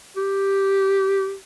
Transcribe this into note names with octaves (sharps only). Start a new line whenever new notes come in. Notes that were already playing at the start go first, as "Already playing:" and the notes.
G4